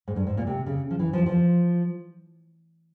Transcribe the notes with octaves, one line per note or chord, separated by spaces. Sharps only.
G#2
G2
G#2
A#2
C3
C#3
F3
E3
F3
F3